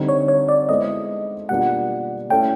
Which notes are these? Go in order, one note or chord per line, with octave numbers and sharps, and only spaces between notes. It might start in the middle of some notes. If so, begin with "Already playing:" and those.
Already playing: D3 G3 C4 D#4
C#5
C#5
D5
G#3 B3 E4 A4 C5 D#5
B2 G3 A#3 D4 F4 F#5
A3 C#4 E4 A4 G5